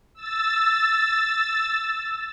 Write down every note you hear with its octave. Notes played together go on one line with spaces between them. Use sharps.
E6 A6